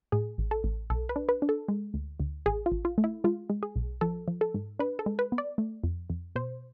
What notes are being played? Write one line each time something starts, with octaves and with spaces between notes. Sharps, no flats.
A2 G#4
A1
A4
A1
B1 A4
B4
D4
B4
D4
A4
G#3
D2
D2
A1 G#4
F4
A1
F4
A3
E4
G#3 F4
G#3
G#4
B1
F3 A4
F3
A4
G#2
D4 B4
A4
G#3
B4
B3
D5
A3
F2
F2
B2 C5